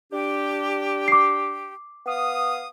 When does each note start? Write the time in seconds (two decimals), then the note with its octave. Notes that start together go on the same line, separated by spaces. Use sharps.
0.12 D4 G4
1.08 D6 C7
2.06 B3 F5 D#6